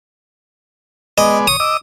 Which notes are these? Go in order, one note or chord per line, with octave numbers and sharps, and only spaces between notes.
G#3 B3 D5 D#5
C#5 D#6
D#5 D6 E6